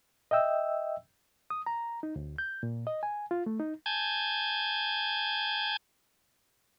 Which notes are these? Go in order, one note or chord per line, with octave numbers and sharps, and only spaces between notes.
D#5 E5 G5 E6
D#6
A#5
D#4
D2
G6
A#2
D#5
G#5
F4
A3
D#4
G#5 A5 G6 G#6